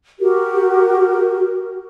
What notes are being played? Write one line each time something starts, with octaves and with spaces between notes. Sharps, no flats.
F#4 G4 A#4